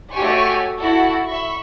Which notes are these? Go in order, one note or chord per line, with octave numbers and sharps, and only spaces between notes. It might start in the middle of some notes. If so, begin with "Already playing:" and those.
A3 F#4 G4 C#5 G#5 C#6
E4 F#4 A4
E5 B5 C#6